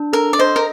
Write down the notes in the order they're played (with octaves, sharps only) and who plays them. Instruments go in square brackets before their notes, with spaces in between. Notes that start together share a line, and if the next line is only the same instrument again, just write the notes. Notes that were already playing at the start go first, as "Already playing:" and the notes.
Already playing: [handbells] D4
[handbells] A4 [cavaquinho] A#4
[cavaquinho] D5
[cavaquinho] C5 [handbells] D#5
[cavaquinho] A#4